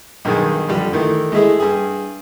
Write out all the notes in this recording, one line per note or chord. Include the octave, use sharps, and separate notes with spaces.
B1 G2 D#3 G#4 G#5
F2 D3 G3 G4
D#3 E3 A3
G#3 A3 E4 G#4
G2 G#4